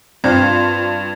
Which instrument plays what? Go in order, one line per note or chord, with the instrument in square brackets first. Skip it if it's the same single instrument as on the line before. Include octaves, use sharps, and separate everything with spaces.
[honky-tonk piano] G2 [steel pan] C4 D4 F5 [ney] F4 [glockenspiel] G#6